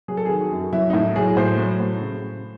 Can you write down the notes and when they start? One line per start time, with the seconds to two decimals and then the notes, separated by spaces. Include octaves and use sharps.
0.08 F#3 G#4
0.17 A4
0.25 D#3 G#4
0.40 F#4
0.52 F#2
0.73 F#3 E4
0.90 D#4
0.93 A2 E4
1.16 F#3 G#4
1.37 A2 C5
1.58 F#3
1.80 A2
2.01 C#3